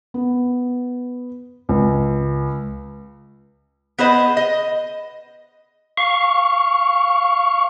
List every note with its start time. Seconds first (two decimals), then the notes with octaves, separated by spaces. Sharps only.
0.14 B3
1.69 C#2
3.98 B3 G#4 B4 C5 D#5
4.37 D#5
5.98 F5 C#6